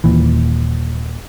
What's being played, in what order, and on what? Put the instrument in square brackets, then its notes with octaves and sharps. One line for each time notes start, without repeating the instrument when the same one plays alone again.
[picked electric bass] D#1 C#2 A#2 E3